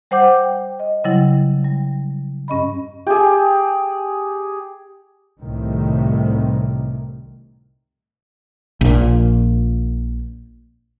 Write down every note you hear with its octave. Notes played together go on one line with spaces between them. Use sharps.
G3 C5 F#5 D6 G6
G5
D#5
C#3 F#3 G3 E4
G3
G2 C#4 D#5 B5
G4 G#4
C2 A2 C3 D#3
A#1 A#2